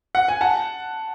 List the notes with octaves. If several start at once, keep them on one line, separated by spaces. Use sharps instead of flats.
F#5
G#5
F#5 A5